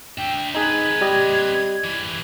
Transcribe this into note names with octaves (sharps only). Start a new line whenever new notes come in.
D4 E5 G5
C4 D#4 G#4 B4 G#6
G3 G4 D#5
E3 G3